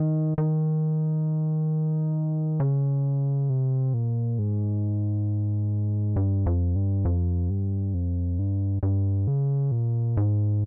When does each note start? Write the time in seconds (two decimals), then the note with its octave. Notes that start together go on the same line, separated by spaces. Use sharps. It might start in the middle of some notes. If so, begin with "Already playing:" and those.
Already playing: D#3
0.38 D#3
2.60 C#3
3.50 C3
3.94 A#2
4.39 G#2
6.16 G2
6.46 F2
6.76 G2
7.05 F2
7.50 G2
7.94 F2
8.39 G2
8.83 G2
9.27 C#3
9.72 A#2
10.17 G#2